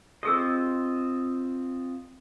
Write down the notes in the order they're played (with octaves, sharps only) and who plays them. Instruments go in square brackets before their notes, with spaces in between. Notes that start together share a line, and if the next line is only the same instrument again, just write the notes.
[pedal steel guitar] C4 F4 D#5 [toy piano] G4 G#4 E6